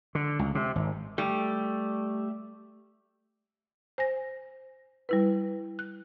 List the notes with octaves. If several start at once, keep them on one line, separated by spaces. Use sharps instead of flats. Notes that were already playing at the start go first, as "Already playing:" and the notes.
D3
C#2
C3
G#1
G3 A3
C5 G#5 A#6
G3 E4 B4
F#6